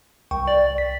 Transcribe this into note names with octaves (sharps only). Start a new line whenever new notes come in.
C2 G5 C#6
D5
B6